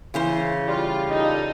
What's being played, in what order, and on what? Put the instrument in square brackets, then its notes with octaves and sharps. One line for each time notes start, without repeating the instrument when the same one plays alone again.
[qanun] C#3 E3 C5
[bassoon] G3 [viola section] F4
[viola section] D#4 A4 [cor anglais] D#5